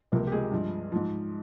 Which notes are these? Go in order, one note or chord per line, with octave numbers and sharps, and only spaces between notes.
C#2 C3 F3 A#3 A#4
G4
G#3 G#4
G2 F3
G#2 F3